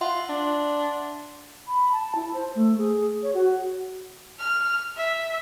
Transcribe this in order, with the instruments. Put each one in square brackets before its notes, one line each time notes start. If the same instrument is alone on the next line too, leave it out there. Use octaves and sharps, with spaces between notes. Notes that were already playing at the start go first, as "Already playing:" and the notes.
[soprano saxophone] F4 [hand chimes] E5 F#5 C6
[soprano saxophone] D4
[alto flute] B5
A5
E4
C5
A3
G#4
C#5
F#4
[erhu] F6
E5